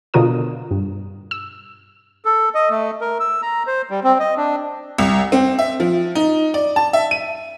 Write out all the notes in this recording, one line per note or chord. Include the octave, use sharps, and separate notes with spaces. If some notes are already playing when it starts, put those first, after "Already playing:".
B2 D3 F4 A#4 D#6
G2
E6
A4
D#5
A3
A#4
E6
A#5
C5
G3
C4
D#5
D4
C2
C4
E5
F3
D#4
D5
A5
E5
D#7